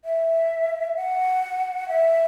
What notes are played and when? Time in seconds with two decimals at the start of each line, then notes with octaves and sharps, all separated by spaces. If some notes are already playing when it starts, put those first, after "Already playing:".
0.04 E5
0.96 F#5
1.89 E5